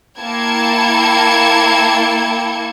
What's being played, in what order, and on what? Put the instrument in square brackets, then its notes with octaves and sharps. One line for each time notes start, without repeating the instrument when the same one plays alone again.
[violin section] A#3 E4 G5 A5 G#6 C#7